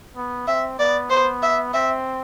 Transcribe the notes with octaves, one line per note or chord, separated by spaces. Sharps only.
B3
C4 E5
B3 D5
B3 C5
E5
C4 E5